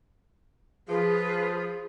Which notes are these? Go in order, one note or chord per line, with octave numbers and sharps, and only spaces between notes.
F3 F4 G#4 B4